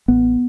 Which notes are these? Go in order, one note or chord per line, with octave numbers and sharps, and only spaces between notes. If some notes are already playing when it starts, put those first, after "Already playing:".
A1 B3